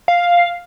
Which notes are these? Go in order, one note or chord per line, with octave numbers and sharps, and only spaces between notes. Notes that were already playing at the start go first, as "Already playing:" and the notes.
F5